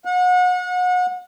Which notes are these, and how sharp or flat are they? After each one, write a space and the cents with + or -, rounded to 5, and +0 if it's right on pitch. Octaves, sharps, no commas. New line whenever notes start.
F#5 -35